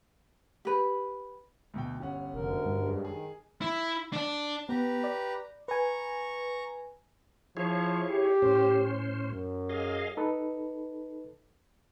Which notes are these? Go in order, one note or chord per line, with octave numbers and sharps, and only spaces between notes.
G4 B4
D2 B2 G5
G1 C#4 F#5
F1 D2 D3 A#4
G2
F#2 G#3
D#3 G#4
E4
D4 D5
B3 G4 B4 A#5
D5
B4 G#5 A#5 C#6
F3 E4 G#4 C#5
G4
A2 C#4 C5
F#2
G#4 D#5 F5
D#4 A4 B4